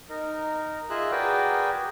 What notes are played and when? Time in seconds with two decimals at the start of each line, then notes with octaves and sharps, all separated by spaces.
0.09 D#4 A#4
0.90 F4 G#4 D#5 E5 F#6
1.11 F#4 G#4 A#4 B4 D5 G5